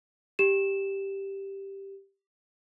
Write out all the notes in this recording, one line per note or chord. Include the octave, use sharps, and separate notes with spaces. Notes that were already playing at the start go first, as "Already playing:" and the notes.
G4 E7